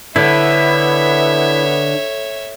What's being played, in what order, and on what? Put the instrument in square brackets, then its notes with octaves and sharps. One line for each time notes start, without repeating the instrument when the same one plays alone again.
[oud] D3 [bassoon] B3 [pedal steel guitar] E4 [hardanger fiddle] C#5 E5